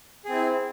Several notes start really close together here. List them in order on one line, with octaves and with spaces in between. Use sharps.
G#4 C4 E4